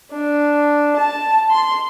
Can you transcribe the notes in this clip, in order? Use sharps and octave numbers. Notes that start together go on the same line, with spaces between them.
D4
A5
C6